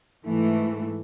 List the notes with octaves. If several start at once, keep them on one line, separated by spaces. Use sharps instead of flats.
G#2 E3 A3